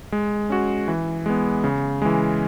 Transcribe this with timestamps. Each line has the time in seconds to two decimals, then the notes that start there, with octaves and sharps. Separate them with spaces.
0.12 G#3
0.50 C#4 F#4
0.88 E3
1.26 G#3 B3
1.64 C#3
2.02 E3 G#3